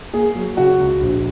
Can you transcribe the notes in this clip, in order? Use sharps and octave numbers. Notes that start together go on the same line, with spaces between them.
A#3 G#4
F#3
C#3 F#4
C#2
A#1